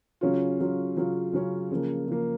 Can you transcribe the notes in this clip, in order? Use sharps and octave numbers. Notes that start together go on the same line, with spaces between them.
C#3 F#3 C#4 F4
C#3 F#3 C#4 F4
C#3 F#3 C#4 F4
C#3 F#3 C#4 F4
C#3 F3 A#3
C#3 F3 A#3